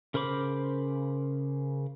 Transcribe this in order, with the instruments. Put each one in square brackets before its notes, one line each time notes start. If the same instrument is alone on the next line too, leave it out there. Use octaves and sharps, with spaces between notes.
[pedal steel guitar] C#3 A#4 C5 B5 D6